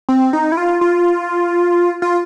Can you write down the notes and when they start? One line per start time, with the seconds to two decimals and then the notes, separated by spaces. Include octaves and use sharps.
0.09 C4
0.33 D#4
0.52 E4
0.57 F4
0.81 F4
2.02 F4